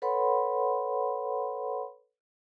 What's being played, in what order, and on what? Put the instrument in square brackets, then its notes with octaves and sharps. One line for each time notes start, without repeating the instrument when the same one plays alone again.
[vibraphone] A4 B4 C#5 F#5 B5 C6